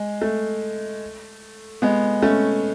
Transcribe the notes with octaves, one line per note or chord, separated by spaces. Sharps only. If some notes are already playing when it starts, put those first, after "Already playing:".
Already playing: G#3
A3
G#3 B3
A3 C#4